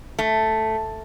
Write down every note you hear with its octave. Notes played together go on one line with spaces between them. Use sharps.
A3